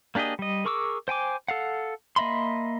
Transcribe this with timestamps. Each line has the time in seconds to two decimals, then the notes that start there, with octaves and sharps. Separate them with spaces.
0.15 A#3 D4 G4 G#4 D#5
0.39 G3 D#5
0.65 G#4 A#4 C#6 D6 E6
1.08 C5 G5 G#5 D6
1.48 A4 F5 F#5
2.16 A#3 D#5 E5 B5 C6